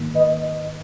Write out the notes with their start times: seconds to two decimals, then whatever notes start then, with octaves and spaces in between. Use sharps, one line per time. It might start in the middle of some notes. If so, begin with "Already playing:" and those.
Already playing: G#2 D#3 A#3
0.15 B4 D#5